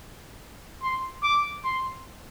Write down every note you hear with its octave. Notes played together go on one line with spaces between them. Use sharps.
C6
D6
C6